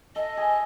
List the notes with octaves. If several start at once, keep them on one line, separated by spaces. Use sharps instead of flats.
A4 D#5
G#4